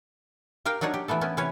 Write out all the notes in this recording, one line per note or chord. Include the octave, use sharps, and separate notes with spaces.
G4 A#4 F5 G5
F#3 D4 D#4 C#5 F#5
G4
E3 A3 B3 A4
B3 C#4 E4
C3 E3 C#4 B4 C#5